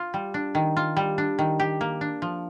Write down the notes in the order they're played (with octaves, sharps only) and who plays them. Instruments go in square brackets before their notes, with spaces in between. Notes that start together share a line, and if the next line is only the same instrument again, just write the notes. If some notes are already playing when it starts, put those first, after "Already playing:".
Already playing: [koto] F4
G3
D4
D#3
F4
G3
D4
D#3
G4
A#3
D4
F3